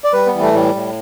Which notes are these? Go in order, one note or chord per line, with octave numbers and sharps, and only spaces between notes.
D5
G3 B4
B3
E3
A3
A2 G3
A2